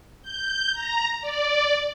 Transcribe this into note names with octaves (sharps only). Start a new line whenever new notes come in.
G6
A#5
D5